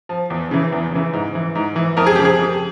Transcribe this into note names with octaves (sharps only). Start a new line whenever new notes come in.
F3
E2
C#3 E3
E2
C#3 E3
G#2
E3
G#2
E3
F2 A#4
G#4
C#3 F3 G4
G#4
F2